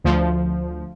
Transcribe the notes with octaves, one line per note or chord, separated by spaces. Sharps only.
D2 F3